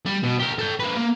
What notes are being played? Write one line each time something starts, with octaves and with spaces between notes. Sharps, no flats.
G3
B2
G4 A#4
A4 G5
A#3 B4
A#3